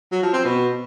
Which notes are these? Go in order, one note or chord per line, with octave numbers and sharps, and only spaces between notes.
F#3
F3
C4
B2